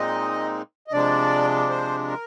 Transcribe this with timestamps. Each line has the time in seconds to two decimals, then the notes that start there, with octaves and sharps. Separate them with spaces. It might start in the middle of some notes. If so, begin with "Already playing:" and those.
Already playing: A#2 G#3 C4 D#4 D#5
0.87 D#5
0.92 C3 F3 G#3 D4 D5
1.69 C5
2.08 A#4